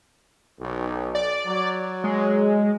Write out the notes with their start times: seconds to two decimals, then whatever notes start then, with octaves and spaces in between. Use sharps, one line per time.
0.60 B1
1.15 D5
1.46 F#3
2.04 G#3